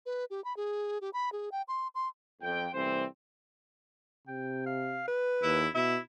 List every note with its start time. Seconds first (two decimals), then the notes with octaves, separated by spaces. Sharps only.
0.06 B4
0.30 G4
0.44 B5
0.57 G#4
1.01 G4
1.13 B5
1.32 G#4
1.52 G5
1.68 C6
1.95 C6
2.41 F2 G5
2.74 C2 E3 A3 C4 C5
4.27 C3 G5
4.66 F5
5.08 B4
5.43 D#2 E4
5.75 B2 E4 E5